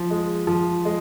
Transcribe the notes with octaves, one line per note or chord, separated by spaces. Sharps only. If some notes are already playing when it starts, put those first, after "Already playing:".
Already playing: F3
G#3
F3
G#3